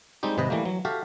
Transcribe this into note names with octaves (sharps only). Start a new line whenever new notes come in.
G3 G#3 C4 D#4 G4
G#1 C3 B4 D#5
E3 G3 A3 A#3
F#3
F#4 G4 A4 E5 F5